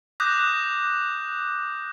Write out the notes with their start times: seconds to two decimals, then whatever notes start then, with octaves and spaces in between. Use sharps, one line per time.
0.20 D6 D#6 F#6 G6 A#6